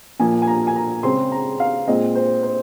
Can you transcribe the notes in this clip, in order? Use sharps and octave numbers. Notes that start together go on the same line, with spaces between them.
A#2 F3 A#3 G#5
G#5
A#5
G#5
A#5
C#3 G#3 C4 C6
A#5
F5
A#2 G#3 C4 D#5
C5
C5